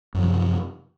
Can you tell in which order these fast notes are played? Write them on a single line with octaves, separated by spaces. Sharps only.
F#2 F3 C3